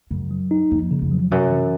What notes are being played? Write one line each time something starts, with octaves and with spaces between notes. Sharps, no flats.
F#2 C#3
F#3
D#4
F2 A#3
C#3
F2
F#3
F#2 C3
E3